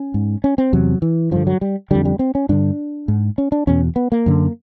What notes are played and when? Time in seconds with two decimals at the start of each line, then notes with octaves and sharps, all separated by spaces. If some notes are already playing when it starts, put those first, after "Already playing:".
Already playing: C#4
0.14 G#2
0.44 C#4
0.58 C4
0.73 E2 C3 F#3
1.02 E3
1.31 G2 D3 F3
1.47 F#3
1.61 G3
1.91 F2 D3 G3
2.05 G3
2.19 C4
2.35 C#4
2.49 G2 D3 D4
3.08 G#2
3.38 C#4
3.52 D4
3.67 E2 B2 C#4
3.96 B3
4.12 A#3
4.26 F#2 D3